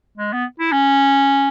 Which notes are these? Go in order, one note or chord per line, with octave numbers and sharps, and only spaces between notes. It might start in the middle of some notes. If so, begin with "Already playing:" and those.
G#3
B3
E4
C#4